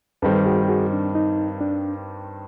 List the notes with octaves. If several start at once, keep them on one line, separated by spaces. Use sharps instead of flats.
G2 D#3 G3 C4 A4 B4
F#4 G#4
F#4 G#4
D4
D#4
D4